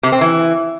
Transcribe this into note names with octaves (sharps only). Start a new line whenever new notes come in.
C3
C4
E3